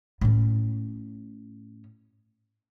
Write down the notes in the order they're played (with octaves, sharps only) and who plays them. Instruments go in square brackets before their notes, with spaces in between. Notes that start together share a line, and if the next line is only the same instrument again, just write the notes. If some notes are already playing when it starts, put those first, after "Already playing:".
[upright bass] A2 C#4